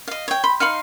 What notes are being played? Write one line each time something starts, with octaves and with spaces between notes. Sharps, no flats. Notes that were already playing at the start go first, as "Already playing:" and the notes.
D#5 F5
C#5 G5
B5 C6
D#4 F5 C6 F6 C#7 F#7